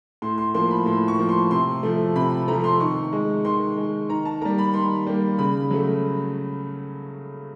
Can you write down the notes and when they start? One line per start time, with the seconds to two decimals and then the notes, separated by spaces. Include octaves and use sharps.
0.22 A2 C6
0.38 C6
0.54 F3 A#3 C6
0.71 B5
0.86 A2 C6
1.08 C#6
1.19 F3 A#3
1.29 C6
1.51 C3 C6
1.83 F3 A3
2.16 C3 B5
2.48 F3 A3 A#5
2.64 C6
2.80 D#3 C#6
3.13 G#3
3.45 D#3 C6
3.77 G#3
4.09 D#3 A#5
4.25 A5
4.41 G3 A#3 A#5
4.58 B5
4.74 D#3 C6
5.07 G3 A#3
5.38 C#3 B5
5.71 F#3 A3